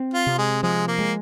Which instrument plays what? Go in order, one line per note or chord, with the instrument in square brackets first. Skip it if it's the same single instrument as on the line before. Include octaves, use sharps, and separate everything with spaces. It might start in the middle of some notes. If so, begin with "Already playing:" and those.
Already playing: [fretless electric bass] C4
[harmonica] F4
[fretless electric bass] C3
[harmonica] G#3
[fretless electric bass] F3 [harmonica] G#3
[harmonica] A#3
[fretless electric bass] G#3